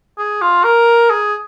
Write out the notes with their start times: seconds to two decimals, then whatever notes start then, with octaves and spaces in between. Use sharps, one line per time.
0.19 G#4
0.42 F4
0.64 A#4
1.10 G#4